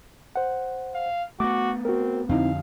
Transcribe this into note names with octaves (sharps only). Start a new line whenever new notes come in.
C5 F#5
F5
A3 B3 F#4 D6
C4 F#4 A#4
F2 D3 C4 D#4 E4 F5